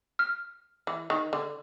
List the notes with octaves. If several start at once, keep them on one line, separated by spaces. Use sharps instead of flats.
F6
E3
D#3
D3